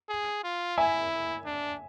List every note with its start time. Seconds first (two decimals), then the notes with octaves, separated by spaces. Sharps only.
0.09 G#4
0.44 F4
0.78 E4 E5 G#5
1.45 D4